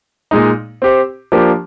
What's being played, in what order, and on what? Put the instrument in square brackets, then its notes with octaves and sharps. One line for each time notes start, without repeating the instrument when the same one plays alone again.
[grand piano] A#2 G#3 D#4
C4 G4 C5
F3 A#3 D4 G4